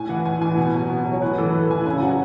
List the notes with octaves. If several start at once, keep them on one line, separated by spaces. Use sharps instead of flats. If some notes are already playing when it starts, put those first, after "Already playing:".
Already playing: A2 G#5
E3 F#5
A2 G#5
E3 G#5
B2
F#3
B2
F#3
C#5
A2 B4
E3 A4
A2 B4
E3 G#5
C#3 G#5
F#3 F#5